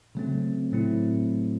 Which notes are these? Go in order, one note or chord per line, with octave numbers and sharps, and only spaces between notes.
C#3 F#3 A3 C4
A2 F#3 A3 C4 E4